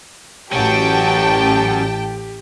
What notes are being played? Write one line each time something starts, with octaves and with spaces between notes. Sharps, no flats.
A1 C#4 F#4 G4 G5 A5